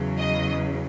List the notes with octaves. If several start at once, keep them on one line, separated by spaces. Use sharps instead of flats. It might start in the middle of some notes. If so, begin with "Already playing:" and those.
Already playing: E2 C#3 F#3
D#5